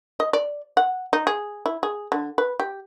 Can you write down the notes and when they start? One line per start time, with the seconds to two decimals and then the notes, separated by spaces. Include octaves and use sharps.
0.20 D#5
0.33 D5
0.77 F#5
1.13 D#4
1.27 G#4
1.66 E4
1.83 G#4
2.12 D3
2.38 B4
2.60 G4